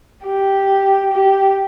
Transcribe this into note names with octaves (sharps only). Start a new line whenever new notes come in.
G4
G4